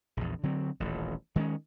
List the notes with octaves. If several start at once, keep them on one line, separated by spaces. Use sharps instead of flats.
A#1 E2
D3 F#3 C4
D#1 A1
D#3 G#3 A3 C#4